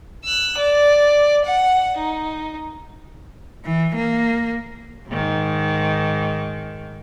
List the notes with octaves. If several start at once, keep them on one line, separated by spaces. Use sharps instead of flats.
E6 F#6
D5
F#5
D#4
E3
A#3
G#2 D#3